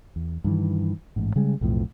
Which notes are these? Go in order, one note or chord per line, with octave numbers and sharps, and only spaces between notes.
E2
G2 D#3 E3
A1 G#2
C#3 G3 G#3
B1 F2 A2 F3